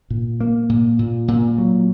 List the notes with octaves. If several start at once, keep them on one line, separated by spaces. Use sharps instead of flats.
A#2
A#3
A#2
A#2
A#2
F#3